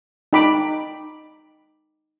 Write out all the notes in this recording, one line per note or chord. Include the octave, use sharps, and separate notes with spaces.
D#4 G5 B5 D6